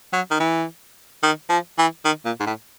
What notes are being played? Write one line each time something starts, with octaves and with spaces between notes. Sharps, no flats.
F#3
D#3
E3
D#3
F3
E3
D#3
A#2
G#2
A2